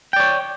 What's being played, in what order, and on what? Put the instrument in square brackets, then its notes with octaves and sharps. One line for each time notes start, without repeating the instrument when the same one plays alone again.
[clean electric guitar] G5
D5
C#5